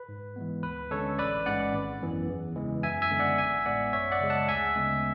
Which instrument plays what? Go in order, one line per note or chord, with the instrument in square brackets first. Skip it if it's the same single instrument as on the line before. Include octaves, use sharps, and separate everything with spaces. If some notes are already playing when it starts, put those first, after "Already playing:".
Already playing: [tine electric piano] B4
G#2
E3 G#3 B3
D2 B4
D3 G#3 C#4 A4 C#5
A1 B4 D5
G#2 G#3 C#4 D5 F#5
G#1
F#2 E3 B3
E2
C#3 E3 G#3
F#2 E5 G#5
E5 G#5
D3 G#3 B3
D5 F#5
A1 E5 G#5
A2 G#3 B3 D5 F#5
F#2 C#5 E5
D5 F#5
C#3 G#3
F#5 A5
D2 E5 G#5
C#3 G#3 B3